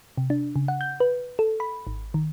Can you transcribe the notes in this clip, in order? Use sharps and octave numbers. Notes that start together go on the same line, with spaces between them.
C3
D4
C#3
F#5
G6
B4
A4
B5
G#1
D#3